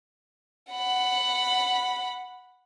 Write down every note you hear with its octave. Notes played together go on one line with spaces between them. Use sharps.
F#5 B5